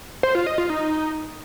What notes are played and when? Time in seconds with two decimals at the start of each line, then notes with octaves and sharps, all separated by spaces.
0.23 C5
0.35 F4
0.46 D#5
0.58 F4
0.70 D#4